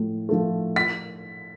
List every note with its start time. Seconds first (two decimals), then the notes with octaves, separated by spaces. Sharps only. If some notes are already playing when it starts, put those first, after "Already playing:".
Already playing: A2 F3 A3
0.29 F3 A3
0.76 B6